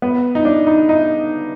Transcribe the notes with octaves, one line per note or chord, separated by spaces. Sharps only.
B3
D#4
D4
D#4
D#4